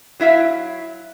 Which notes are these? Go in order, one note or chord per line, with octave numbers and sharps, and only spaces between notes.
F#3 E4 E5 F5